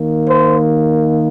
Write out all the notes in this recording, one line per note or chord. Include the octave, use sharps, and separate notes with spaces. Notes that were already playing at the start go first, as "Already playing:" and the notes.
Already playing: D#3 A#3
C5